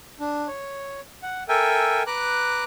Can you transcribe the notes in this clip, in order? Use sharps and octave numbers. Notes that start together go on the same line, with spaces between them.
D4
C#5
F#5
A4 A#4 E5 G5 G#5
B4 A#5 D6 F#6